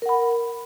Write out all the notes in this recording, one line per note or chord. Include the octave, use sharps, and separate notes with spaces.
A#4 F#5 B5